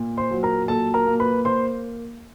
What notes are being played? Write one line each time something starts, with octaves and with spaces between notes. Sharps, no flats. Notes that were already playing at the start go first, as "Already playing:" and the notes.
Already playing: A#2
C5 C6
F#3
A#4 A#5
A#2 A4 A5
A#4 A#5
A#3
B4 B5
C5 C6